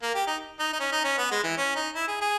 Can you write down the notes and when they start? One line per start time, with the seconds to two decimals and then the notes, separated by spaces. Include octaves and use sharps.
0.02 A#3
0.14 G4
0.27 D#4
0.60 D#4
0.73 D#4
0.80 C#4
0.92 D#4
1.05 C#4
1.18 B3
1.31 G#3
1.44 E3
1.57 C#4
1.76 D#4
1.96 E4
2.08 G#4
2.21 G#4